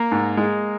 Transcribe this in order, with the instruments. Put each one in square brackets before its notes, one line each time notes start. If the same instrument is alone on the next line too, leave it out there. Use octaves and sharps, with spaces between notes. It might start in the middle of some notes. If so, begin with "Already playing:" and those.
Already playing: [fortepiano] A#3 A#4
G#2
G#3